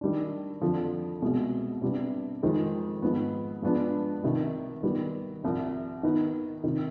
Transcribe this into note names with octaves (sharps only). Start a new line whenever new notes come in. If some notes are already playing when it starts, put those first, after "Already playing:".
D#3 G3 D4
F2 D3 F3
C2 B2 G#3
C3 G3 B3 D4
F2 D#3 G#3 C4
G#2 F3 B3
G2 F3 G#3 B3 D4
C2 C3 D#3
D#3 G3 B3
C2 C3 F3
D#3 B3 D#4 B4
C3 D#3